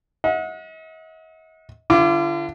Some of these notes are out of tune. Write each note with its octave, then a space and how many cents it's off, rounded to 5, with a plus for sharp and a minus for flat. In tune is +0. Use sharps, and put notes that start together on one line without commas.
D#5 +45 F#5 -35
D3 +0 F4 -45 D6 +0